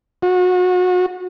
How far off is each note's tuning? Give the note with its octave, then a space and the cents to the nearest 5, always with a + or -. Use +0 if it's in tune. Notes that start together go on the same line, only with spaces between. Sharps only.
F#4 -30